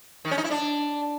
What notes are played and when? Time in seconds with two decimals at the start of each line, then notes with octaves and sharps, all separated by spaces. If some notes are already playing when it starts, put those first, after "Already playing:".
0.25 D#3
0.31 C#4
0.38 D#4
0.44 E4
0.51 D4